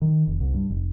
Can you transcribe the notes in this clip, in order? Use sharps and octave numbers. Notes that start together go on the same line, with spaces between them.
D#3
F1
C2
G2
F1